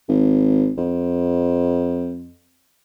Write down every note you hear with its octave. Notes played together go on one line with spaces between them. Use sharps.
G#1
F2